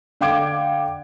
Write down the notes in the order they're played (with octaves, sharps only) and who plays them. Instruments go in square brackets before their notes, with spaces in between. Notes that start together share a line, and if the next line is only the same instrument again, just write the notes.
[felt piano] D3 F5 G5 D6 G#6 D7